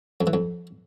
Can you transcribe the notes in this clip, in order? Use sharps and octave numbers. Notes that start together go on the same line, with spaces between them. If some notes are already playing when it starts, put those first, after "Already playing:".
F2
E3
F2